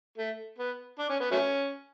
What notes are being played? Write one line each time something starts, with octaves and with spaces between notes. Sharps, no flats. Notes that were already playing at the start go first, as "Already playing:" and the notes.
A3
B3
D4
C#4
B3
F#3 A3 C#4